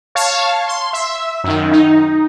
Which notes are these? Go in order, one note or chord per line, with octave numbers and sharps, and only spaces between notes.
C#5 F5 A5
C6
E5
F#2 D#3
D#4